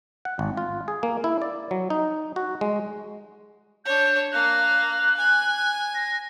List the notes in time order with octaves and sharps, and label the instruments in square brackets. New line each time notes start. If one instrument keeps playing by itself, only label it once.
[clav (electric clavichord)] F#5
G#1
F4
G#4
A#3
E4
D5
F#3
D#4
F#4
G#3
[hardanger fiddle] D4 C#5 [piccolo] G6
[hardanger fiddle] A#3 F5 [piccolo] F#6
[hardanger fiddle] G#5
[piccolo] A#6